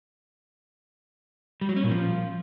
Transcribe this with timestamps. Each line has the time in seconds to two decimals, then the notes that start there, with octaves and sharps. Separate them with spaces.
1.61 G3
1.69 F#3
1.76 C#4
1.84 A#2
1.91 F3